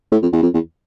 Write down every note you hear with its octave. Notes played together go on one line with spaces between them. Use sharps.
A2
F2
E2
F2
E2